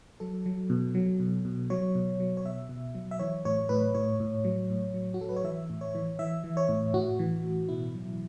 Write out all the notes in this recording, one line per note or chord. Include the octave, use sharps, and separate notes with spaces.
F#3 A4
F#3
B2
F#3
B2
B2
F#3 C#5
B2
F#3
C#5
B2 E5
B2
F#3
E5
E3 C#5
A2 C#5
A2 B4
A2 C#5
A2
F#3
A2
F#3
F#4
F#3 A4
B4
C#5
E3 E5
A2
C#5
E3
E3 E5
E3
C#5
A2
A2 F#4
E3
A2
B2 E4
F#3